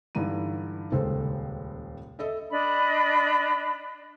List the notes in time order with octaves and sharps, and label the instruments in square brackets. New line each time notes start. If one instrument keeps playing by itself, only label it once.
[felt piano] G2 D3 E3 D#4 D#7
D#1 C#2 G#3 A4 C5
A4 D#5 E5
[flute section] D4 D#5 B5